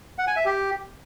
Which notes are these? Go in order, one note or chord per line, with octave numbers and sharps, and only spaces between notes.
F#5
G#5
E5
G4